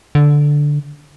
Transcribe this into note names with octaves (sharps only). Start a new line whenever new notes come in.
D3